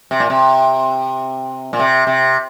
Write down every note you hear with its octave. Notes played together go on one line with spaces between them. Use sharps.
C3
A#2
C3
A#2
C3
C3